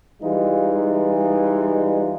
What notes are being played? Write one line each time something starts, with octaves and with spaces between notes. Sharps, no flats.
E3 G3 G#3 D#4 F4